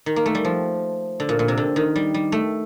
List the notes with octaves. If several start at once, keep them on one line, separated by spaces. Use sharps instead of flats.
D#3
A#3
A3
G3
F3
D3
A#2
A#2
C3
D3
D#3
G3
G3
A3